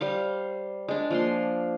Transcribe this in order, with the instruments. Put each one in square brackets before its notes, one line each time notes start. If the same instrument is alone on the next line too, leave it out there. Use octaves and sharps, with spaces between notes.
[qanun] G3 C5 F5
G#3 D4
F3 A#3 C6